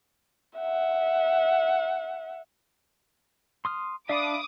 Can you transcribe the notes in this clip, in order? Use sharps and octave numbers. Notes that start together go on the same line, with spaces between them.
E5 F#5
C6 D#6 F6
D4 E5 F5 B5 D6 D#6